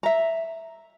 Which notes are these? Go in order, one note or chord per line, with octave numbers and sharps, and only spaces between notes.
E5 A#5